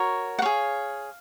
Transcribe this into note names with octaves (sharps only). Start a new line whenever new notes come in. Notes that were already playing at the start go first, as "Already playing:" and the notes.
Already playing: F#4 A#4 C#5
F#5
G#4 C#5 F5